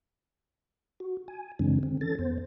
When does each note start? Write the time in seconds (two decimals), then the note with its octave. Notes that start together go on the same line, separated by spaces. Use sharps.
1.00 F#4
1.28 G#5
1.59 F#2 C#3 E3 G#3 C4 D4
1.83 D3 C4
2.01 E3 C#4 A4 A6
2.19 F2 B3 C5